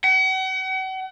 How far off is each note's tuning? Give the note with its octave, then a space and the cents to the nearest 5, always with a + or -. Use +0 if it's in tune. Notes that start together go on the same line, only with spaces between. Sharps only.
F#5 +40